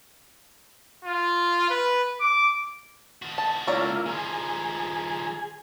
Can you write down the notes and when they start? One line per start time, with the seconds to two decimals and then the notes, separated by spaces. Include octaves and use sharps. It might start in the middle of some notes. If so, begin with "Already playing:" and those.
1.05 F4
1.70 B4
2.20 D6
3.22 D#3 F#4
3.38 A5
3.67 C#2 D3 A#3 E4 F4 C#5 D5 A#5
4.06 D#3 F3 G#4